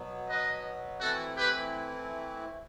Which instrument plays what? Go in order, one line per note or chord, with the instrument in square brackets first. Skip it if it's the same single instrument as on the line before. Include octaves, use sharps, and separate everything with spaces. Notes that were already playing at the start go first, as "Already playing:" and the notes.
Already playing: [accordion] B2 F#3 B3
[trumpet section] B4 D#5
[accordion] E3 A3 C4 E4 [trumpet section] F#4 A4
[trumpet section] G4 B4